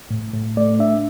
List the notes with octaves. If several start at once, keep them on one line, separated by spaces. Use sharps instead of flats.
A2
A2
A3 D5
D4 E5